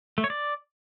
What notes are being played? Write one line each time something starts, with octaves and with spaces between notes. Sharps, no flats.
A3
C#5
D5